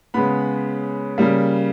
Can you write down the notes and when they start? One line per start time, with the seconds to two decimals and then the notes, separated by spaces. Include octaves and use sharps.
0.14 C#3 G#3 B3 B5
1.18 C#3 G3 A#3